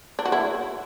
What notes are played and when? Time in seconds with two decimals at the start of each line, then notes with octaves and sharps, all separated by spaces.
0.19 D4
0.25 F#4
0.32 E4